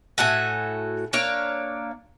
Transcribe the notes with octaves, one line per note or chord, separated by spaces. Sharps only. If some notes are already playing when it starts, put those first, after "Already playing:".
A2 F#4 A4 G#5
A#3 D4 C#5 F5